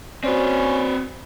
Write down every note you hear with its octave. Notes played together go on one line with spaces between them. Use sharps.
C4 C#4 F#4 B4 C5 D5